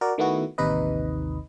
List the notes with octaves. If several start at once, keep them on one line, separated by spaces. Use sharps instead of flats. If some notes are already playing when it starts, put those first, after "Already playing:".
F#4 A#4 D5
D#3 A3 B3 E4 F#4
A1 D#2 C3 D#4 B4 D#5